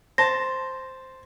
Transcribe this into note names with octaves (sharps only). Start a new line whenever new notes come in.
C5 A5 A#6